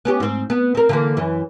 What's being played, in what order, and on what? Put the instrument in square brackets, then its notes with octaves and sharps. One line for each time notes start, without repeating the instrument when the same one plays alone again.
[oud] B3 C#4 G4
G#2 C4
B3
C4 A#4
D3 E3 A#3
F#2 E3